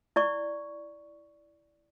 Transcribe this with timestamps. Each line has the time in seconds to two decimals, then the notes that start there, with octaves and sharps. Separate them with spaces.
0.16 E4 D5 C#6